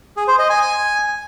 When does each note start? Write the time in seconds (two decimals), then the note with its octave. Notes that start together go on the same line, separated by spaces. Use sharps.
0.17 G#4
0.28 C5
0.39 D#5
0.50 G#5
0.61 G#5